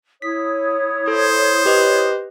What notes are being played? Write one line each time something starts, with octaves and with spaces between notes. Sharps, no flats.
E4 C#5 D#6 B6
A4 C5
G4 B4 D#5